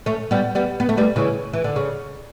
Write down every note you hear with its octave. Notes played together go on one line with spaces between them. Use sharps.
A3 C#4
G3 B3
G3 B3
B3
A3
G3 B3
C#3 E3
E3
D3
C#3